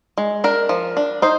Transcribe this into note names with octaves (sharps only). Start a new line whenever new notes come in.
G#3
D4 A#4
F3
D4
D#4 C5